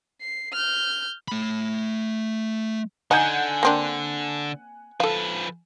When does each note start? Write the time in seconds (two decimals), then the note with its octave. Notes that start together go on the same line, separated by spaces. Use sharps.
0.21 C7
0.53 F6 G6
1.28 A3 B5
3.11 D3 D#4 F#5 G#5 G6
3.63 A#3 C4 D4
5.00 F3 A4 B4 F5